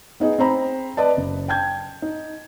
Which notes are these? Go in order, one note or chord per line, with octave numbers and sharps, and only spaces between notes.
B3 D#4 G#4 D#5
C4 C5 A#5 B5
B4 D5 D#5 A5
F#1
G5 A5 G6 G#6
D#4